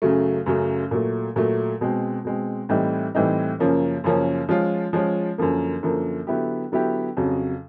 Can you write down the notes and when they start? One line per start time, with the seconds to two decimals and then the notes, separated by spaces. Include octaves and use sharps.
0.02 F#2 C#3 F#3 A3
0.46 F#2 C#3 F#3 A3
0.91 A#2 F#3 A3
1.36 A#2 F#3 A3
1.81 B2 G#3 C4
2.25 B2 G#3 C4
2.69 A2 E3 G3 C4 D#4
3.15 A2 E3 G3 C4 D#4
3.59 F#2 C#3 F3 A#3 C#4
4.04 F#2 C#3 F3 A#3 C#4
4.49 F3 G#3 C#4 F4
4.93 F3 G#3 C#4 F4
5.38 F#2 D3 F3 A#3
5.83 F#2 D3 F3 A#3
6.27 D3 F#3 B3 E4 G4
6.72 D3 F#3 B3 E4 G4
7.17 F2 C#3 F#3